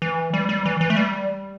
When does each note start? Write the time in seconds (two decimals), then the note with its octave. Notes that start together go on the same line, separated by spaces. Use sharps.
0.02 E3
0.33 G3
0.49 G3
0.65 E3
0.81 E3
0.90 A3
0.96 G3